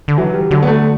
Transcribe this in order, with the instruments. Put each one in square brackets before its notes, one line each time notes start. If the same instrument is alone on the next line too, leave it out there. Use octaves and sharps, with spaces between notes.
[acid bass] D3
[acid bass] E3 [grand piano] F#3
[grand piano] G3
[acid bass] D3 [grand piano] F#3
[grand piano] B3
A3